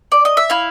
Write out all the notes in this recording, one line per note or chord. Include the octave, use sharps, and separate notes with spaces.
D5
D#5
E5
E4 F5